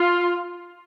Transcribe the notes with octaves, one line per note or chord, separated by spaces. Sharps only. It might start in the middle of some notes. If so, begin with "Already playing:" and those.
Already playing: F4